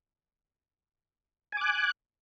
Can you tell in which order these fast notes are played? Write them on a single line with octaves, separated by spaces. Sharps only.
G#5 D6 F#6